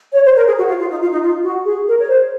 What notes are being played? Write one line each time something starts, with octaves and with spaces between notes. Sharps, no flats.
C#5
C5
A#4
G#4
F#4
F4
F4
D#4
F4
D#4
F4
F#4
G#4
A#4
C#5
C5